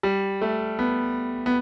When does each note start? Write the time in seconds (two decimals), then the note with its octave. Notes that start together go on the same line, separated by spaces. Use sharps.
0.03 G3
0.41 A3
0.79 B3
1.46 B3